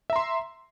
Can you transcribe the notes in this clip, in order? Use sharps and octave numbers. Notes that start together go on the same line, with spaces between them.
E5 A#5 C6